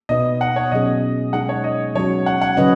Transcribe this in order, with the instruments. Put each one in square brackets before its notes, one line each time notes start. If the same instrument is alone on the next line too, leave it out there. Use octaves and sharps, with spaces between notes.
[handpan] B2 B3 D#4 F#4 B4 [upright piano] D#5
[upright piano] F#5
C#5
[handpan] B2 F#3 C#4 G#4 [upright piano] D#5
[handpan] G#3 D#4 G#4 [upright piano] F#5
[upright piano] C#5
D#5
[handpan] F#3 C#4 F#4 [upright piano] C#5
[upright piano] F#5
F#5
[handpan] C#3 F#3 C#4 B4 D#5